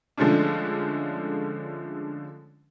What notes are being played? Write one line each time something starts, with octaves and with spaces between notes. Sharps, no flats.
D3 F3 G#3 A3 C#4 D4